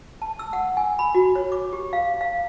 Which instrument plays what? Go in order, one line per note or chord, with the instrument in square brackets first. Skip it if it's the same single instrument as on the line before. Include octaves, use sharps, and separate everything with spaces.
[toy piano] A5
E6
F#5
G#5
B5
F#4
C#5
D6
G4
F5
F5